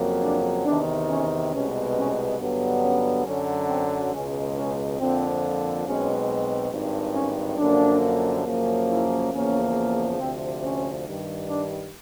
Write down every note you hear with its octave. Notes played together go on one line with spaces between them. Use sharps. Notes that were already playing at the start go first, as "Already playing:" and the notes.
Already playing: F2 C#3 F#3 A#3
D4
E2 C3 D#3 D4
C#4
C2 B2 G#3 B3 C#4
C#4
G2 D3 F#3 B3
C#4
F#2 D3 F#3 C#4
C4
C#2 B2 G#3 C#4
C#4
F2 D3 F3 A#3 C4
B1 B2 G#3 C4 C#4
G#1 G2 D#3
C#4
F#2 D3 F3 A#3 D4
F#2 C#3 F3 A#3
E4
E2 C#3 F3 A#3 C#4
D2 C3 F3 C4
C#4
G2 D#3 G3
D4